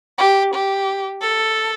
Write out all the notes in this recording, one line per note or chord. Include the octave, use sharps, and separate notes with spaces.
G4
G4
A4